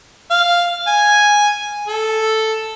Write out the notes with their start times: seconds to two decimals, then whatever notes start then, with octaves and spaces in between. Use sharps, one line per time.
0.31 F5
0.87 G#5
1.87 A4